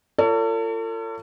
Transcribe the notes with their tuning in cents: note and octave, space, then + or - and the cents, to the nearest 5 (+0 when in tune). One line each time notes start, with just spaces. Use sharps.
F4 -25 A4 +40 C#5 +35